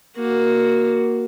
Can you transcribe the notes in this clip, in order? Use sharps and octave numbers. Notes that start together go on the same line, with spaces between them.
A#3 F#4